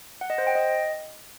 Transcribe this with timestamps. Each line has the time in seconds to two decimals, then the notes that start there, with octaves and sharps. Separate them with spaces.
0.21 F#5
0.30 D#5
0.38 C5
0.47 G5
0.55 D#5